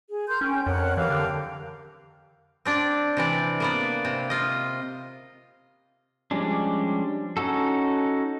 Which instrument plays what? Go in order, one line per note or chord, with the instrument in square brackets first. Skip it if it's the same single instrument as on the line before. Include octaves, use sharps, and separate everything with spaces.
[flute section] G#4
A#4 C6 G6
[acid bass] C#4 [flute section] G5 G#5
[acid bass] F2 [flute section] A#4 C#5 F#5
[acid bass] E3 [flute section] G4 A#4 F5
[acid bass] D3
[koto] C4 D4 D5
C3 E3 D5
A#3 B3 D5
C3
F4 D#5
[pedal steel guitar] F3 G3 G#3 C#4 D4
C#4 D#4 F#4 A4